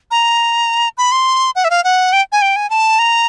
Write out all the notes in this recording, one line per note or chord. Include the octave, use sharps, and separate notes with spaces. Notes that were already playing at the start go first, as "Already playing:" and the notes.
A#5
B5
C6
F#5
E5
F5
F#5
G5
G#5
G5
G#5
A5
A#5